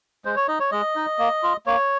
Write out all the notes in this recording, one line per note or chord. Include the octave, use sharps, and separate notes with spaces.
G#3 C5
C#5
D#4 D#5
C#5
G#3 D#5
D#4
A#3
F4
A#3 C#5